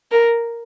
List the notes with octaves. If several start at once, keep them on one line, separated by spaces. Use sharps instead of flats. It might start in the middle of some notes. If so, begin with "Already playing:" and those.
A#4